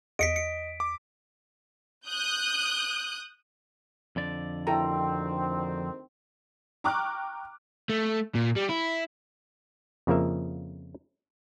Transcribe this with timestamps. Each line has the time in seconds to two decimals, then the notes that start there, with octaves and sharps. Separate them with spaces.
0.19 E2 D#5 B6 C#7 D7
0.36 C#7
0.80 D6
2.07 D#6 F#6 G6
4.16 F2 D3 D5
4.67 D2 D#3 C4 E4 A4 G5 A#5
6.84 G5 A#5 C#6 D6 F6 F#6
7.90 A3
8.35 A#2
8.56 G3
8.70 E4
10.07 F2 C#3 F3 A#3 A#4 E5